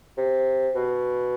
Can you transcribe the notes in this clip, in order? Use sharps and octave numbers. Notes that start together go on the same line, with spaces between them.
C3
B2